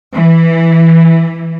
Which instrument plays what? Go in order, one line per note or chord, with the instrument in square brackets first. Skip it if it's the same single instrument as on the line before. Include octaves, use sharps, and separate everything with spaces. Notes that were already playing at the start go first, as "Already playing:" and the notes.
[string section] E3